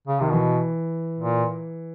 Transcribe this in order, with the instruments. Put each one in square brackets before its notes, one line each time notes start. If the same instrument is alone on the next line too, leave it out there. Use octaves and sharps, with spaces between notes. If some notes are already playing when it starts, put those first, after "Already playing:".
[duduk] C#3
[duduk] C3 [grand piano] D#3
[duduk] B2 [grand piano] E3
[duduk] A#2